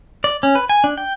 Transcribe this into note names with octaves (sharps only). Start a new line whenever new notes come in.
D5
C#4
B4
G#5
D4
G5